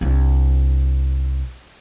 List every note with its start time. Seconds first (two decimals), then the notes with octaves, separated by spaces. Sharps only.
0.01 C2 D4